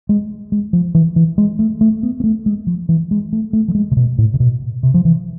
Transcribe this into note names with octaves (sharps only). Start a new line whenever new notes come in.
G#3
G#3
F3
E3
E3
G#3
A3
A3
B3
B3
A3
G#3
F3
E3
G#3
A3
A3
F3
G#3
C3
B2
A2
C3
B2
C3
F3
E3